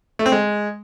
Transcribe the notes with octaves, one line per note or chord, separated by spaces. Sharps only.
A3
C4
G#3